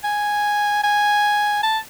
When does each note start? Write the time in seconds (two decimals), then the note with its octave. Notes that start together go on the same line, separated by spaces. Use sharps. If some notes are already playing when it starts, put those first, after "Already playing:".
0.04 G#5
0.84 G#5
1.63 A5